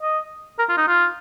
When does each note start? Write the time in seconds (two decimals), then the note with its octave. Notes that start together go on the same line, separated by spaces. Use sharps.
0.02 D#5
0.59 A#4
0.69 F4
0.78 D#4
0.88 F4